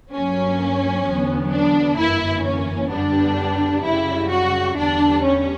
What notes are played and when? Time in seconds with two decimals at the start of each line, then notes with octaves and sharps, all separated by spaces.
0.13 G2 F#3 A#3 C#4
1.06 E2 D3 F#3 B3
1.52 D4
1.98 G1 F#2 E3 A#3 E4
2.44 C#4
2.91 F#2 D3 G3 B3 D4
3.84 F#2 C#3 G3 E4
4.30 F#4
4.76 E2 D3 G3 D4
5.23 C#4